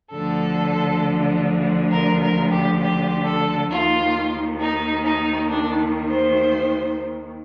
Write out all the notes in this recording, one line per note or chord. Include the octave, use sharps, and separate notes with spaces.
D2 D3 F3 A4
A#4
A#4
G4
G4
A4
D#2 D#3 F4
D#4
D#4
D4
C5